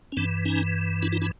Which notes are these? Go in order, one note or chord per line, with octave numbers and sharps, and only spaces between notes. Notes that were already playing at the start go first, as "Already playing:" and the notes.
C#4
G2 E3 C4 D4
C#4 D#4
D4 E4
D#4 F4
D4 E4